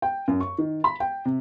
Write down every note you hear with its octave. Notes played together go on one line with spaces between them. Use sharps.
G5
F#2
C#6
D#3
B5
G5
C3